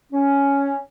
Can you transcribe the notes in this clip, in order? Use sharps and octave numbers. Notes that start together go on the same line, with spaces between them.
C#4